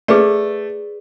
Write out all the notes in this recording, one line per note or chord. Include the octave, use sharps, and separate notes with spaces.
A3 G#4 B4 D5